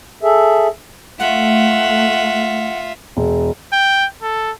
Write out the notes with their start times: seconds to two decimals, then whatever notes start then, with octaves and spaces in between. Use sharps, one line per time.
0.23 G#4 A4 E5
1.20 A3 F4 E5 F#5
3.17 E1
3.73 G5
4.22 A4